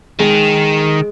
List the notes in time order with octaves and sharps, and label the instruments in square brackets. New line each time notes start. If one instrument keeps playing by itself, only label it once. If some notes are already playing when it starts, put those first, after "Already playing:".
[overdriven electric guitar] D#3 [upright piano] G#3